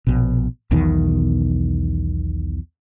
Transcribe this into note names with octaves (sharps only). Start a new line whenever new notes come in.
A#1 B2
B1 E2 B2 D#3